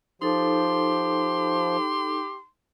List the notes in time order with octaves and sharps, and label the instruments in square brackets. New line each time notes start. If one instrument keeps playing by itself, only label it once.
[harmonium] F3 [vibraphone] D#4 A4 [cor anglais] G4 [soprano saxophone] C6